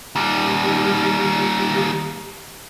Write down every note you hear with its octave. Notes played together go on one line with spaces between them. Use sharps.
D#2 G3